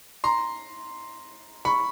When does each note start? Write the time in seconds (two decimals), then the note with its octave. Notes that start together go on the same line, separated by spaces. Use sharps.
0.24 A#5 C6
1.65 B5 C#6